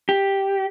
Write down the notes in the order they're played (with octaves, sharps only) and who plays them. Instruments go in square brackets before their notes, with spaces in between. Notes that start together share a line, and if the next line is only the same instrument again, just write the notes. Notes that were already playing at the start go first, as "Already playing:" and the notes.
[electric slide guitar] G4